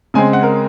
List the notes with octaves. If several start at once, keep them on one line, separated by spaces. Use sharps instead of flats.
C#3 G#3 C4 G#5
F#5
A#4